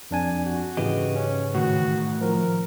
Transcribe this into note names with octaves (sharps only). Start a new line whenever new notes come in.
F2 D4 G#5
F#4
G#2 C#3 E3 G4 D#5
C#4
A2 D#3 F#4
F3 A#4